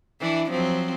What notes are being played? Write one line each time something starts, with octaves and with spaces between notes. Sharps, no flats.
E3 D4 E4
F3 F#3 C4